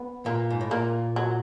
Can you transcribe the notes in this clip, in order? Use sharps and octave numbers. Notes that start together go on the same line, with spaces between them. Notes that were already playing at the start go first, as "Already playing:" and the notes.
Already playing: B3
A#2 A#3
G#2
A2
A#2 A#3
F#3